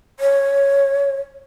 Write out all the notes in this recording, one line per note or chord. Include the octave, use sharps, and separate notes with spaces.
C#5